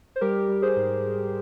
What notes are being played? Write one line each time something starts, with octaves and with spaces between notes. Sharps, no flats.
C5
G3 G4 A#4
G3
G#4 C5
G#2
G#2